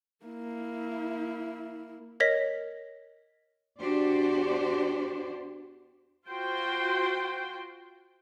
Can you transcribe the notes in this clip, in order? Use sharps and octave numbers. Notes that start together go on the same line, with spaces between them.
A#3 E4
A#4 C#5 D#5 A#6 B6
E2 D4 F#4 G4 C5 D5
F4 F#4 C5 G5 C6